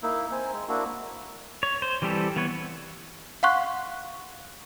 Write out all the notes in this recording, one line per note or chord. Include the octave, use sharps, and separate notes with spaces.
A#3 D#4 E4
C4 C5 G#5
G#3
A#3 D4 E4 F#4
C#5
C5
E3 G3 C4 G4 A4
E3 B3 B4 C#5
F5 F#5 C6 C#6 F#6